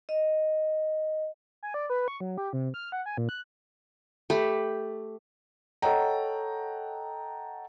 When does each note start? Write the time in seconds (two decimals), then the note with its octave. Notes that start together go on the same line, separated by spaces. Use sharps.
0.09 D#5
1.63 G#5
1.74 D5
1.90 B4
2.08 C#6
2.20 F#3
2.38 G4
2.53 C3
2.74 F6
2.92 F#5
3.06 G#5
3.18 A#2
3.29 F#6
4.30 A3 G4 B5
5.82 A4 C#5 D#5 F#5 G5 A#5